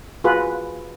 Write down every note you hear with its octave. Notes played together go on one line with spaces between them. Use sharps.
F4 F#4 G#4 B4